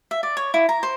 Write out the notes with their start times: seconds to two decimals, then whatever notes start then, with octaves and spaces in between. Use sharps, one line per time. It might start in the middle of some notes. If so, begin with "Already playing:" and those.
0.11 E5
0.23 D5
0.37 C#5
0.54 E4
0.69 A#5
0.83 C5